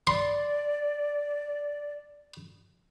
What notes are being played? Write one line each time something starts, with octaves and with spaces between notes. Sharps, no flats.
D5 C6